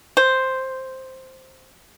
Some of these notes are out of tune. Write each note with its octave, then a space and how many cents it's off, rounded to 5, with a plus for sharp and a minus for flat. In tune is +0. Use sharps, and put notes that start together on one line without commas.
C5 +0